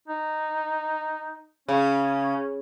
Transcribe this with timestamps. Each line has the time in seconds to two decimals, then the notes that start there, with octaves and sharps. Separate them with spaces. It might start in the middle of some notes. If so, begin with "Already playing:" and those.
0.08 D#4
1.68 C#3 C#4